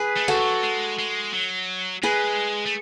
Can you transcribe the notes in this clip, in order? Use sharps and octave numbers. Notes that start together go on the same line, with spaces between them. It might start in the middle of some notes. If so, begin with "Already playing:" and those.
Already playing: G#4 B4
A3
F#4 A4
E3
F#3
G#3
G#3
F#3
G#3 G#4 B4
A3